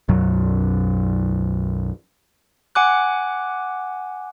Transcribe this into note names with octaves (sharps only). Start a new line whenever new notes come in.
B1 F#2 F#3
F#5 G#5 D6 F#6